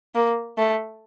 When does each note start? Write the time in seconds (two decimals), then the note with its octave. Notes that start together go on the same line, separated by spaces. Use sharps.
0.15 A#3
0.58 A3